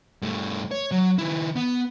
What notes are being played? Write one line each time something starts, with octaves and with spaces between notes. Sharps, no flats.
G2 A3
C#5
F#3
D#3 E4
B3